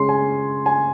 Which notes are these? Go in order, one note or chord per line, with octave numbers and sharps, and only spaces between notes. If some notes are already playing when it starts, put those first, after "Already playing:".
Already playing: C#3 G#3 C#4 C6
G#5
G#5